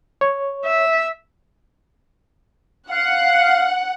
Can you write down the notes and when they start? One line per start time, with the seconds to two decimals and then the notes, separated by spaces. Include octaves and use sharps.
0.21 C#5
0.65 E5
2.91 F5 F#5